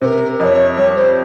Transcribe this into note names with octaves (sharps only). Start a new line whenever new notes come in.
C3 A#4 C5
F2 C#5 D#5
G3 C#5
C5